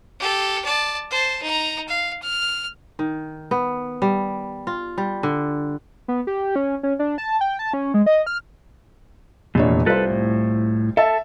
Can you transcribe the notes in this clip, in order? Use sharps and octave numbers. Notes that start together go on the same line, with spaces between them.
G4 A4
D5 A5
C5 A5
D#4 A#5
F5
F6
D#3
B3
G3
F4
G3
D3
B3
G4
C#4
C#4
D4
A5
G5
A5
C#4
G#3
D#5
F6
F1 E2 A#2 D4 C#5
C2 F4 A4 B4 C5
A2
A4 E5 A5